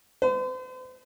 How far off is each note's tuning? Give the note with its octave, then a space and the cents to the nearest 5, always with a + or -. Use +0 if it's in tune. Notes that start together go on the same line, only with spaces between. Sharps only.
C5 -45